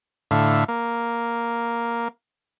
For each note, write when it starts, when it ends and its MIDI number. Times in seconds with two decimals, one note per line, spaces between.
0.31 0.64 45
0.31 0.64 50
0.31 0.64 76
0.31 0.64 77
0.68 2.08 58